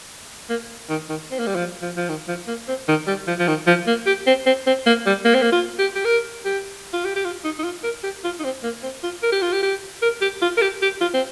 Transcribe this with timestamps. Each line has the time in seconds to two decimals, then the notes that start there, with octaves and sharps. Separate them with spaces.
0.49 A#3
0.89 D#3
1.09 D#3
1.31 C4
1.39 A#3
1.47 G3
1.55 F3
1.82 F3
1.97 F3
2.08 D#3
2.28 F3
2.47 A#3
2.68 C4
2.88 D#3
3.07 G3
3.27 F3
3.39 F3
3.48 D#3
3.67 F3
3.87 A#3
4.06 G4
4.27 C4
4.46 C4
4.66 C4
4.86 A#3
5.06 G3
5.25 A#3
5.35 C4
5.42 A#3
5.52 F4
5.78 G4
5.95 G4
6.05 A#4
6.45 G4
6.93 F4
7.05 G4
7.15 G4
7.25 F4
7.44 D#4
7.59 D#4
7.64 F4
7.83 A#4
8.03 G4
8.24 F4
8.39 D#4
8.44 C4
8.63 A#3
8.83 C4
9.03 F4
9.23 A#4
9.32 G4
9.42 F4
9.52 G4
9.63 G4
10.02 A#4
10.21 G4
10.42 F4
10.57 A#4
10.61 G4
10.82 G4
11.01 F4
11.14 C4